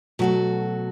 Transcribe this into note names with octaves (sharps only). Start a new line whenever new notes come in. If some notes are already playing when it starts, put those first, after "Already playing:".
B2 F#3 A3 F#4 A4